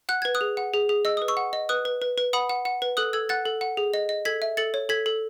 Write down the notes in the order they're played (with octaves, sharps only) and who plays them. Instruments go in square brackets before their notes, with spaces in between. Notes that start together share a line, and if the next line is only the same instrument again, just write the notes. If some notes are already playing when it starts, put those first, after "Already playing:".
[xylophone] F#5 F#6
B4 G#6
D#6 F#6
G#4
F#5
G#4
G#4
D#5 E6
B4 D#6
C#6 E6
F#5
D#5
B4 D#6 F#6
B4
B4
B4
F#5 B5 D#6
F#5
F#5
B4
A4 D#6 F#6
A4 E6 G#6
F#5 F#6 A6
A4
F#5
G#4
D#5
D#5
A4 G#6 B6
E5
A4 A6 C#7
C#5
A4 G#6 B6
A4